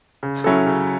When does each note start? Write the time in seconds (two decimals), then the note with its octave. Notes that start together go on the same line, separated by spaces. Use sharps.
0.23 C#3
0.44 F#3 C#4 E4 A4
0.66 C#3